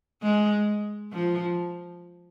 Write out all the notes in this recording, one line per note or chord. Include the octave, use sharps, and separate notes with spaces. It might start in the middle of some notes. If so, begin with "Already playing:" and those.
G#3
F3